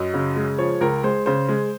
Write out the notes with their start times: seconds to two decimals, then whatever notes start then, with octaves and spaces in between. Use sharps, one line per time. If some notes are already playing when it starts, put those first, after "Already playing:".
Already playing: F#2 D#5
0.14 C#3
0.36 G#3
0.58 F3 C#5
0.81 C#2 A#4
1.03 G#3 C5
1.26 C#3 C5
1.49 G#3